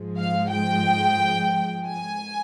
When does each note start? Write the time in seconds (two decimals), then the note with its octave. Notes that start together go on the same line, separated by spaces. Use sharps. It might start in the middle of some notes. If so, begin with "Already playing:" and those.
Already playing: G#2 F3 G#3
0.18 F5
0.51 G5
1.86 G#5